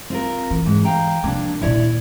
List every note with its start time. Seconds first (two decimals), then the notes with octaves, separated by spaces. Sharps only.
0.10 C4 F4 A#4
0.51 E3
0.66 G#2
0.85 F5 G5 A#5
1.24 C3 F3 A#3 D4
1.62 D#2 A#2 E4 C#5 D5